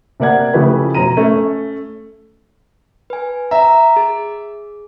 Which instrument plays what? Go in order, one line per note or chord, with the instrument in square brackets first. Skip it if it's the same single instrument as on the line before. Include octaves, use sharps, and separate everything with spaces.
[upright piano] C3 A#3 D5 F#5 G#6
C#3 E3 F3 A3 G4 B4
F1 B2 A#5 D#7
A3 C#4 A4
[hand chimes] B4 G#5
[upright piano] E5 [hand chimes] A#5
[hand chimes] G#4